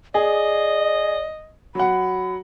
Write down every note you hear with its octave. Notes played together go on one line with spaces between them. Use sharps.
G#4 D5 D#5
F#3 F#5 B5